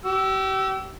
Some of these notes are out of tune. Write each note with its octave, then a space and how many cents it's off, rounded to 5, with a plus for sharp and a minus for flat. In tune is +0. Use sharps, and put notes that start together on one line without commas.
G4 -35 E6 +0